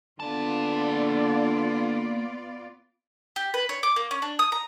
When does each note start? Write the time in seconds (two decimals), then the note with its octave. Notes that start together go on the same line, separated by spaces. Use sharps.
0.20 D3 A#3 B3 F4 D5 A5
3.36 G4
3.54 B4
3.69 C#5
3.83 D6
3.96 A#3
4.11 C#4
4.22 D4
4.39 D#6
4.52 A#5